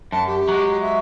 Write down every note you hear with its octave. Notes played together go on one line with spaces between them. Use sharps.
F#2 A5
G4
F#3 G#3
E5